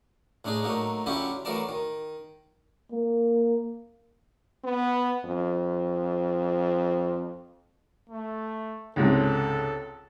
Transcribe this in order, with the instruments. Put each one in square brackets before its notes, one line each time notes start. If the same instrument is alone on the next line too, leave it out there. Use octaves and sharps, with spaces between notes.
[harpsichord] A2 A3 D4 D#4 G#4
F#3 A3 A#3 D#4
D3 F#3 C#4 E4 F4 G4
E3 F#3 A3 A#4 D5 A5
D#3
[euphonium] A#3
[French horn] B3
F2
[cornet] A3
[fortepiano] C#2 G#2 C3 [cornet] A4